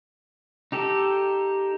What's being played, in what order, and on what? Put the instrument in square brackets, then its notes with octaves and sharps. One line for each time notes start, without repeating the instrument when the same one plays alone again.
[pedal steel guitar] D#4 G4 A4